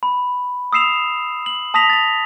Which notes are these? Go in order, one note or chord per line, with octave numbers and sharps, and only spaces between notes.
B5
D#6 E6 C7 E7 F7
F#7
A5 D#6 A#6 B6 F7
A6 F7